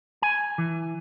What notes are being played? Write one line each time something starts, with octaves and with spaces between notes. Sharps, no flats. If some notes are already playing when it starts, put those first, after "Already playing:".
G#5
E3